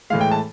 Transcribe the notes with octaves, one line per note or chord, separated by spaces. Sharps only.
A2 E3 G#3 F5
G5
A5